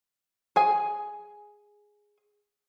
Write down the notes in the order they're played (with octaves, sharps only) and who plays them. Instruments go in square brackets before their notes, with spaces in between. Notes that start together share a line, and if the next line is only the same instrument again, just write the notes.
[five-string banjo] G#4 G#5